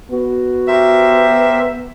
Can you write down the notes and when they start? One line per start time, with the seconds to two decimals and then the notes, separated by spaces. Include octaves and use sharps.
0.11 B3 F#4
0.68 G4 A#4 C5 E5